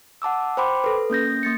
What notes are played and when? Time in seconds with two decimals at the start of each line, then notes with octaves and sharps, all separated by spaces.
0.22 F#5 A5 D6 E6
0.57 C5 G5 B5 C6 D6
0.84 A4 B4
1.10 A#3 C#4 G6 A#6
1.43 A#3 A6 C#7